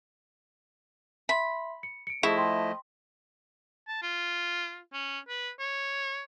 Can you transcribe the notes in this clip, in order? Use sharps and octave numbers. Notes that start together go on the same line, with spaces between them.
E5 B5 C6
C#7
C#7 D7
F3 A3 E4 G#4 D#5 C#6
G5 C6
A5
F4
C#4
B4
C#5